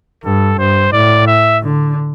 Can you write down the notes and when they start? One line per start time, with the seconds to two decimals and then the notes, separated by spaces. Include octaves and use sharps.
0.24 G2 A4
0.58 G2 C5
0.92 A2 D5
1.27 E5
1.62 D3